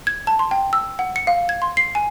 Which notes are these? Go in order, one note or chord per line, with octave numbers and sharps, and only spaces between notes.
G#6
A5
C6
G5
E6
F#5
C#7
F5
G#6
C6
C7
G#5